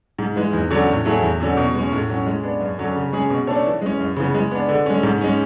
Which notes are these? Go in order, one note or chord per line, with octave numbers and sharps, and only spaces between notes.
G#2
E3 G#3
E2
D3 F#3 C#4
A2
F#3 A3 E4 G#4
E2
D3 F#3 C#4
B2
G#3 C#4
A2
F#3 C#4
G#3
B3 D4
F#2
D3 F#3 C#4
C#3
G#3 C#4 G#4
B2
A3 D4 A4 C#5
E3
G#3 C#4
F#2
C#3 E3 B3
G#3
B3 D4
D3
G#3 C#4
G#2
G#3 C#4